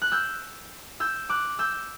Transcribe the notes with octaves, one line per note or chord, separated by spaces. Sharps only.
F#6
E6 G6
E6 G6
D6 F#6
E6 G6